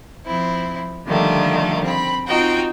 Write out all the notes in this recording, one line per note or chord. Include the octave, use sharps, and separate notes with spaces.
F3 C4 E4
D3 D#3 F3 G3 A3 A#3
C4 B5
C4 D#4 F4 F#4 G5